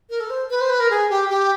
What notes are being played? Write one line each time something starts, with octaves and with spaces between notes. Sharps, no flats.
A#4
A4
C5
B4
C5
B4
A#4
G#4
G4
G4